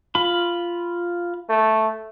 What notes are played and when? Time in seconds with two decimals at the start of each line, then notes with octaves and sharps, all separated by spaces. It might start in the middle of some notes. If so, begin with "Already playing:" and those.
0.15 F4 B5
1.49 A3